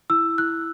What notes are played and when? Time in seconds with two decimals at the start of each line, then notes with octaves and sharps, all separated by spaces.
0.10 E4 E6
0.38 E4 F#6